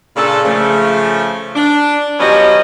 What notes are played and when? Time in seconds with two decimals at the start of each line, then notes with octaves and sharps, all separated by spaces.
0.17 A#2 C#3 D4 A4
0.44 C#3 F3 A3
1.55 D4
2.19 F3 F#3 B3 C#4 G4 D#5